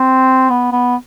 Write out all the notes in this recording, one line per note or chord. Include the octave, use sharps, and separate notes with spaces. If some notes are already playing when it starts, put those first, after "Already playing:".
Already playing: C4
B3
B3